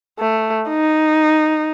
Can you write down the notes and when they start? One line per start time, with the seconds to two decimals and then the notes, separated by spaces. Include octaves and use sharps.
0.19 A3
0.69 D#4